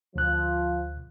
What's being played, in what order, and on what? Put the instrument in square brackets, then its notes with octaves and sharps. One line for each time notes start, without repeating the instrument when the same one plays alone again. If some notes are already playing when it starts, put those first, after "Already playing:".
[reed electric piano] D2 F#6 [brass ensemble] F3